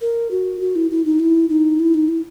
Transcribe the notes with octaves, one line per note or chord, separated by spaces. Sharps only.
A#4
F#4
F#4
E4
E4
D#4
E4
D#4
E4
D#4
E4